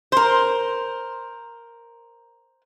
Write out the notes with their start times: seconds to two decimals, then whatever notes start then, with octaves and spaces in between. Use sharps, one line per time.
0.12 A#4 C5